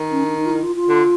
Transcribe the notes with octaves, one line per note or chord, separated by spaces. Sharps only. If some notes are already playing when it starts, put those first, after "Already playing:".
Already playing: D#3
C#4
D4
D#4
F4
E4
F4
F4
D3